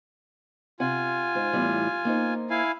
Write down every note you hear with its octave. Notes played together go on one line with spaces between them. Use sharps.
C3 F4 F#5 G#5
G#2 C5
E2 A2 G3
A#3 D#4 C5
E4 F5 G#5